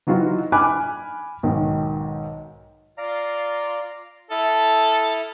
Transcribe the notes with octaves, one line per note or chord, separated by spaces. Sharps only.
E3 F#3 D#4 F4 F#4
G#5 B5 D6 F6 F#6
B1 G#2 D#3
F4 D5 F5 A#5
E4 A4 D#6 F6